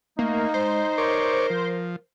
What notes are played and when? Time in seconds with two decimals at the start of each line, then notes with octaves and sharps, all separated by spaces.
0.19 A3 A#3 D#4
0.54 G#3 C5
0.98 A#4 C#5 D5
1.50 F3